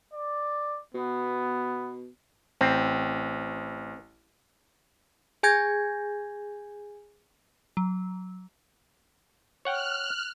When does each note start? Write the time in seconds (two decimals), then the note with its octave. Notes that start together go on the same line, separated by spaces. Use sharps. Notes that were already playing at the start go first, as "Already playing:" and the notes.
0.14 D5
0.94 B2 B3
2.61 A1 C4
5.43 G#4 G#5 G6 G#6 A#6
7.77 F#3
9.65 C#5 F#5 G5 F6 F#6